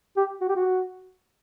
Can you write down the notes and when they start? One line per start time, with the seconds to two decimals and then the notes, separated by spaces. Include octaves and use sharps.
0.17 G4
0.41 F#4
0.49 G4
0.56 F#4